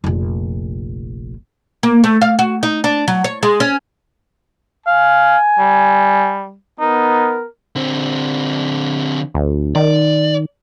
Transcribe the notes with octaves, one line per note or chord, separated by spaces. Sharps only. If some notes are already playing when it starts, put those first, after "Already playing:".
F1 A#1
A#3
A3
F5
F#4
D#4
D4
F#3
C#5
G#3
C#4
F5 G#5
G3
B3 D#4 A#4
D3 C4
D2
D#3 D5